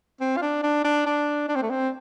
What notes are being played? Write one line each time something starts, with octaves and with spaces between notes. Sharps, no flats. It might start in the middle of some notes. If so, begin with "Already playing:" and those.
C4
F4
D4
D4
D4
D4
D4
C4
A3
C4